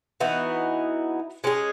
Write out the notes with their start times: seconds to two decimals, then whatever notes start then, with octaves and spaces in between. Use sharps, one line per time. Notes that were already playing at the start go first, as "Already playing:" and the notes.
0.20 E3 B3 D#4 F#4
1.44 G#3 C#4 G#4